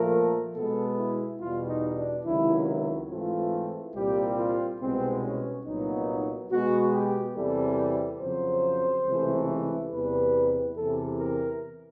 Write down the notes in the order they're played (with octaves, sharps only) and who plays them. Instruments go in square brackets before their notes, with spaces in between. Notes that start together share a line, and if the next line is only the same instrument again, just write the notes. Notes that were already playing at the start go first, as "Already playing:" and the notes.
Already playing: [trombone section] A#2 F3 A3 A#4
B2 G#3 B3 A4
E4
E2 B2 G3 F4
D#4
D4
C#2 C3 D#3 F#3 E4
E4
G#2 E3 A3 C4 F4
C2 A#2 G3 C4 G4
F4
C2 B2 G#3 B3 C4
C#4
C2 A#2 F#3 B3 D#4
B2 G#3 B3 F#4
G4
E2 C3 E3 G3 C4 A4
F2 C#3 F#3 C5
C#2 C3 E3 A3
E2 C3 E3 G3 B4
E2 C3 E3 A4
A#4